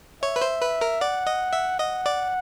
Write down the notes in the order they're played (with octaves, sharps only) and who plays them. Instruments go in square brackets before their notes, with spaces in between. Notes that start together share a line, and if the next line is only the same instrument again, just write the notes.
[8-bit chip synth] C#5 [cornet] E5
[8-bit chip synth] B4
C5
B4
A#4
[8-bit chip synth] D5 [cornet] F#5
[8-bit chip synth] D#5
E5
[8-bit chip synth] D#5 [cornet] F#5
[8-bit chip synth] D5